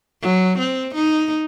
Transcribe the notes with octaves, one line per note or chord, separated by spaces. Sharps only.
F#3
C4
D#4